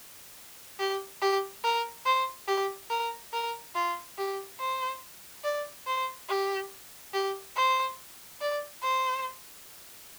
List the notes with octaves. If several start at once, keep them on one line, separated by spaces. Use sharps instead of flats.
G4
G4
A#4
C5
G4
A#4
A#4
F4
G4
C5
D5
C5
G4
G4
C5
D5
C5